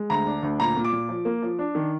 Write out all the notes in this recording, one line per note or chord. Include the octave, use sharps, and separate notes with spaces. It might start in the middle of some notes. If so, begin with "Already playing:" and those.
Already playing: G#3
D2 A#5
D4
D2
A#2 A#5
A#2
D6
A#2
F3
A#3
F3
D4
D#3